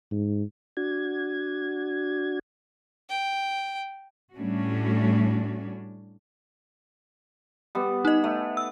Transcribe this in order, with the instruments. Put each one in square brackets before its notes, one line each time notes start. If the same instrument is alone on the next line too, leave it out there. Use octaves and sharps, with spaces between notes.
[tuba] G#2
[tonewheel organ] D4 F#4 G#6
[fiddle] G5
[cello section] A2 G3 A3 C#4 D4 F#4
[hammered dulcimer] G3 B3
[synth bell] D#4 D#5
[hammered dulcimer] A3
[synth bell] E6